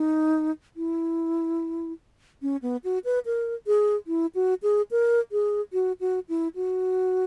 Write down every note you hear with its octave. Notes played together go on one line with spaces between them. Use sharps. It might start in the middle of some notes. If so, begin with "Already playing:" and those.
Already playing: D#4
E4
C#4
B3
F#4
B4
A#4
G#4
E4
F#4
G#4
A#4
G#4
F#4
F#4
E4
F#4